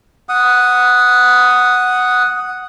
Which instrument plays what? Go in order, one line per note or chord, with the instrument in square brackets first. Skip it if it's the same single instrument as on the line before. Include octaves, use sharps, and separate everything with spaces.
[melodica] F#5 D#6